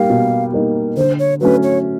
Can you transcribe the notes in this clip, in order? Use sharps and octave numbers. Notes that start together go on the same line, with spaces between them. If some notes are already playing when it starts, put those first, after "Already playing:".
Already playing: G3 A#3 D#4 F5
B2
G3 A#3 D#4
D3 C5
C#5
F#3 A3 C#4 B4
C#5